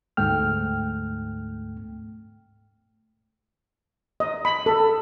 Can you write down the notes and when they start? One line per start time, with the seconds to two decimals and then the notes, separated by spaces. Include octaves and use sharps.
0.17 D2 G#2 A3 G5 F6
4.20 D#5
4.45 B5
4.66 A4